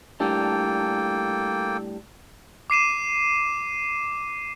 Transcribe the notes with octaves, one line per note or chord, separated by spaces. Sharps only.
A2 G3 A#3 D4 A4 G5
D6 C7 D#7 E7